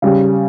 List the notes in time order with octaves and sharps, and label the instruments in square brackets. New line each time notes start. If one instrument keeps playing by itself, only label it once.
[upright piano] C#3 G3